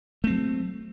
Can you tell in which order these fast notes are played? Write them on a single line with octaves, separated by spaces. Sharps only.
A3 C4 F#3